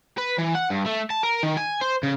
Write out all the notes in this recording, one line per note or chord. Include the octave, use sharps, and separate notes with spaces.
B4
E3
F#5
G2
A3
A5
A#4
D#3
G#5
C5
C#3